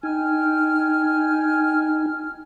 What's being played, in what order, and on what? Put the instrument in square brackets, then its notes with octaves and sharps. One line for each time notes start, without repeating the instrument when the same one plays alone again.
[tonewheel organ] D#4 [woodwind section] G5 G#5 F6